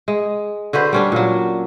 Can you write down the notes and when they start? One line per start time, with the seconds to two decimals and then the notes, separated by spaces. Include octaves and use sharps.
0.08 G#3
0.73 D3 F#4 B4 C5
0.93 G3 C#4 D4
1.12 A#2 F#3